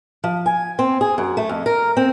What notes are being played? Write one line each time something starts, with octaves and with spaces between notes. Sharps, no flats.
F3
G#5
C4
G#4
F#2
A3
F2
A#4
C4